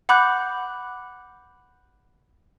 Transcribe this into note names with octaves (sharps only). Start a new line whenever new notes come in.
F#5 B5 D6 F#6 G6